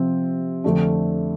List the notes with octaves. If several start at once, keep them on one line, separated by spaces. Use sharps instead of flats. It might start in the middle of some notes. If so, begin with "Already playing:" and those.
Already playing: C3 F3 C4
F2 D3 A3 D4